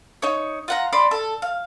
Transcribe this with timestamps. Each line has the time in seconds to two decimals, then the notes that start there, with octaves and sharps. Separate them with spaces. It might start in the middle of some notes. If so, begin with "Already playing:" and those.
0.22 D#4 C#5
0.68 F4 F#5 A#5
0.93 D5 B5 C6
1.11 A4
1.42 F5